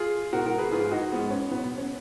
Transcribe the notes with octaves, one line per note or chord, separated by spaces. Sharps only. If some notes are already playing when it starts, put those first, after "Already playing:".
Already playing: F4 G#4
B2 G#3 F#4 A#4
F#4 A#4
G#4 B4
G#2 F3 G#3 F4 G#4
D#4 F#4
G#2 F3 G#3 B3
C#4
B2 F#3 B3
B3
C#4